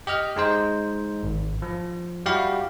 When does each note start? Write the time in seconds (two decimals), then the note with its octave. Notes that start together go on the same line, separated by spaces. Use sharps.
0.07 G4 D#5 F6
0.36 G#3 D#4 C5
1.23 G#1
1.62 F3
2.26 G3 E4 F#4 G4 F5